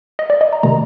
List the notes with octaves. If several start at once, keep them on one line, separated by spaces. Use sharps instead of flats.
D#5
D5
D#5
A#5
C3 D#3 A3 A#5